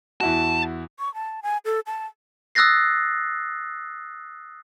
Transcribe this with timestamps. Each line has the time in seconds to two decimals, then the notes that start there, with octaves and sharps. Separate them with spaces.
0.21 E2 E4 F#4 A5
0.99 C#6
1.14 A5
1.43 G#5
1.65 A4
1.87 A5
2.55 D#6 E6 F#6 A6 A#6 C7